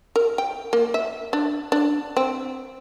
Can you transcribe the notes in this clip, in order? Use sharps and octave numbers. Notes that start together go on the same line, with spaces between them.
A#4
G5
A#3
E5
D4
D4
C4